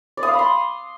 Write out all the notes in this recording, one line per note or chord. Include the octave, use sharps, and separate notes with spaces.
D5
D#6
F5
B5
C6